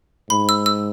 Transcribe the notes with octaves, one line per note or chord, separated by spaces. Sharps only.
G#2 B5
E6
E6